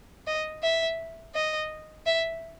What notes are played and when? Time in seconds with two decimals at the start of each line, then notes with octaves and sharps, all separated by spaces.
0.27 D#5
0.63 E5
1.35 D#5
2.06 E5